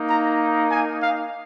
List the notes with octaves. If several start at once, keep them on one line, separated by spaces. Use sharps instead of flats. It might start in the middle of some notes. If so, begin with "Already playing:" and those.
Already playing: A#3 D#4
A#5
G#5
F5